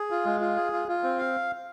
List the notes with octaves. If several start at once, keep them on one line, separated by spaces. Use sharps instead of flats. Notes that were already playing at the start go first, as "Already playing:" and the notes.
Already playing: G#4
F4
G#3
F4
G#4
F4
F4
C4
F5